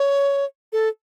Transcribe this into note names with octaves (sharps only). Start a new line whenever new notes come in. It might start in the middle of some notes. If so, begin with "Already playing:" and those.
Already playing: C#5
A4